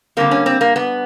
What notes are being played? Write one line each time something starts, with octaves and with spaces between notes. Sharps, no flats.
D3 G3 A#3 C4
C#4
C4
A#3
B3